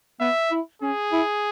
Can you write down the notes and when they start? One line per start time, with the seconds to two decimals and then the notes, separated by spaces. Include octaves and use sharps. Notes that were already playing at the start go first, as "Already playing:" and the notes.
0.20 B3 E5
0.51 E4
0.82 C#4 G#4
1.12 E4